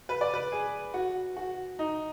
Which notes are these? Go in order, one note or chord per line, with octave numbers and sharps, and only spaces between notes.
B4
D5
B4
G#4
F#4
F#4
D#4